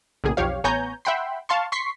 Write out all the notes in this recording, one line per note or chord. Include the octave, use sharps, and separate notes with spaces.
B1 A2 C#3 A#3 G#4
B1 F2 F3 G4 C#5 F5
A1 B3 C#5 G#5 A#5 G6
E5 F#5 G5 B5 C6
F5 A5 C6 C#6
C6 C#6 B6 C7